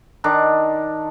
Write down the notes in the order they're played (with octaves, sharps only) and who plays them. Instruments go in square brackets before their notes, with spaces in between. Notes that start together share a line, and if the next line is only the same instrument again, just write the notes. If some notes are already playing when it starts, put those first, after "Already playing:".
[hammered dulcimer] D#3 D4